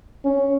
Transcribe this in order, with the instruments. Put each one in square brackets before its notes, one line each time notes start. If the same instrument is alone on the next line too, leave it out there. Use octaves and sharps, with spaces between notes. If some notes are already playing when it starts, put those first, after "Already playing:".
[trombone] C#4